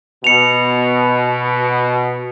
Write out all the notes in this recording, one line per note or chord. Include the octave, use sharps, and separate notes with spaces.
B2 C#7 F7